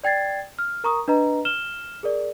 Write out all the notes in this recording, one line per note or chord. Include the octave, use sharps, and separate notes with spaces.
D5 G5 G#6 A6 C7
F6
A#4 A#5 C#6 D#6
D4 B4 D#5 A#5
F6 E7 G7
G#4 A#4 D5